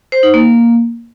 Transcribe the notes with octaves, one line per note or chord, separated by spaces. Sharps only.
C5
D#4
A#3